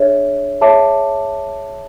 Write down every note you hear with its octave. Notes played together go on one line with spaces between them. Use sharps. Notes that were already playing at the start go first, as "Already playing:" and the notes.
Already playing: D4 G#4 C#5 E5
G#4 C#5 E5 A5 D6